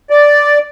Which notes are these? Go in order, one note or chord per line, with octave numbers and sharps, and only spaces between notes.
D5